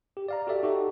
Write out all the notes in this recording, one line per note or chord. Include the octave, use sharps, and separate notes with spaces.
G4
D5 F5 A#5
F#4 G4 A4 D5 E5
D#4 F#4 G4 A4